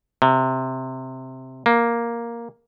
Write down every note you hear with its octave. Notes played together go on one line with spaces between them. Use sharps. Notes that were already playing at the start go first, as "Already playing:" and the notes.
C3
A#3